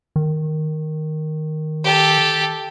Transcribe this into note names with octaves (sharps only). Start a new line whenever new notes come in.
D#3
G4 A4